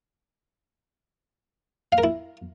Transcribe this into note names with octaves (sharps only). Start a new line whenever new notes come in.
F5
A#4
E4